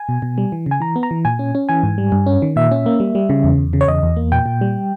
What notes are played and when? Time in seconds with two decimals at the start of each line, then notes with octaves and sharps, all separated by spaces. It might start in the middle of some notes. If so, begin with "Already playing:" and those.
Already playing: G#5
0.09 B2
0.22 B2
0.38 G3
0.52 E3
0.66 C#3 G#5
0.80 E3 A#5
0.96 B3
1.03 A#5
1.11 E3
1.25 A#2 G#5
1.39 C#4
1.55 C#4
1.69 E3 G#5
1.83 G#2
1.98 G3
2.12 G2
2.26 C#4
2.42 D#3
2.56 A#2 E5
2.71 C#4
2.86 A#3
3.00 G3
3.15 G3
3.29 C#3
3.44 E2
3.58 E2
3.73 C#3
3.81 C#5
3.88 E2 D#5
4.03 E2
4.16 A#3
4.32 A#2 G5
4.46 A#2
4.61 G3